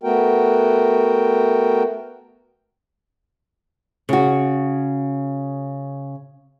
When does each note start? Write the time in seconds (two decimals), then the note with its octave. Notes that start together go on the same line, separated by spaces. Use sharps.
0.03 A3 B3 F#4 A#4 G5
4.09 C#3 F#4